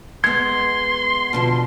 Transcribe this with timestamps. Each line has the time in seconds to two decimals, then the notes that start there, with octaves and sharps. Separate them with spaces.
0.24 G#3 B3 C6 G#6
1.33 B2 D3 F3